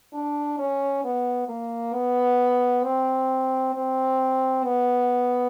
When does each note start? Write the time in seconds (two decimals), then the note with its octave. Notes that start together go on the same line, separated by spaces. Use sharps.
0.13 D4
0.58 C#4
1.04 B3
1.48 A#3
1.93 B3
2.83 C4
3.74 C4
4.64 B3